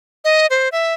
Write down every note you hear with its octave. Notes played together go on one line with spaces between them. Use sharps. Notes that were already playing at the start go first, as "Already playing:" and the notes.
D#5
C5
E5